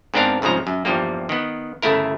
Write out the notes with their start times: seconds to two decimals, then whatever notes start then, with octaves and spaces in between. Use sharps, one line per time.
0.14 G#2 B3 C4 D4 A#4 F5
0.42 C2 G#2 C#3 F3 A#5
0.67 F#2
0.85 E2 G2 F3 G3 A#3
1.29 D#3 B3
1.82 G1 C#3 A3 E4 A#4